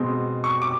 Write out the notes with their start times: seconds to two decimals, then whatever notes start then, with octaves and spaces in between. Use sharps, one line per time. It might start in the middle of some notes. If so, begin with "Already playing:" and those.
Already playing: B2 G#3 C4
0.44 C#6
0.62 D6